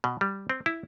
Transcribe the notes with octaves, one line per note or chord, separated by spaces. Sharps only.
B2
G3
C4
E4